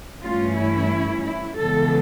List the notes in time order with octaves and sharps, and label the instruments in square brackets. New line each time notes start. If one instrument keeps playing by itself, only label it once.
[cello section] G2 E3 A3 C#4 F4
E4
E4
C#3 E3 G#3 B3 A4